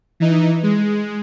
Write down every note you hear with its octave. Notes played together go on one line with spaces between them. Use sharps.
E3 D#4
G#3